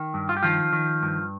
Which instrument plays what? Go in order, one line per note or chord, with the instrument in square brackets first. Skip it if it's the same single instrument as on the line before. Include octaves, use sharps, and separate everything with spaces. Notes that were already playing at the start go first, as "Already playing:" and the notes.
Already playing: [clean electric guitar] D#3
G2
F4
G4
D#3 F3 F4
D#3
G2